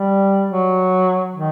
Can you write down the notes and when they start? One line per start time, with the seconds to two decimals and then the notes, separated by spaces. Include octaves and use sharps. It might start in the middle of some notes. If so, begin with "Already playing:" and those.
Already playing: G3
0.49 F#3
1.36 D#3